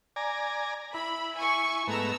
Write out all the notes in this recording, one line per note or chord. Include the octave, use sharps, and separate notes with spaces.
D5 G#5 A#5
E4 B5
G#5 C#6
G#2 A3 B3 A#5 E6